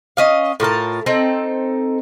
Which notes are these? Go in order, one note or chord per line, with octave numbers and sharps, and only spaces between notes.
C#4 D#5 F5
A2 F4 A#4 A5
C4 D#4 A4